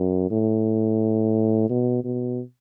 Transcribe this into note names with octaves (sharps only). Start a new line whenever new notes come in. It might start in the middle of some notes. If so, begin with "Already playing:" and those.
Already playing: F#2
A2
B2
B2